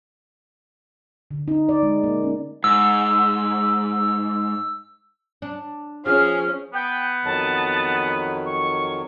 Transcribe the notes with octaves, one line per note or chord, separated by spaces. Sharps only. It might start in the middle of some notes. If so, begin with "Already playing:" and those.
D3
D#4
D5
G#3
A#3
C#4
G#2 E6
D4
F3 C#4 G#4 F6
B3 G5
F2 D#3 F#3 A5
C#6